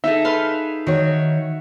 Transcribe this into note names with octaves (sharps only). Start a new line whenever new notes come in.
D#4 G#4 A4 E5
B4 F5 C6
D#3 F#4 C#5